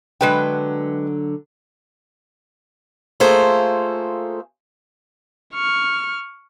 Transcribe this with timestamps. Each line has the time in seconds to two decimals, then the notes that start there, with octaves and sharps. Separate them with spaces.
0.21 D3 F#3 G#3 D4 B4 G5
3.20 A3 A#3 F4 G#4 A4 C5
5.55 C#6 F6